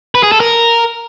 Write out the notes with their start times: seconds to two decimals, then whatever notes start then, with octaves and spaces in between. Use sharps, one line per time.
0.15 B4
0.23 G#4
0.32 A4
0.40 A#4